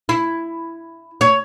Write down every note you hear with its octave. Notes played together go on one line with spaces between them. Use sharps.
E4
C#5